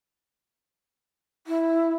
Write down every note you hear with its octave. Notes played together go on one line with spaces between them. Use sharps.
E4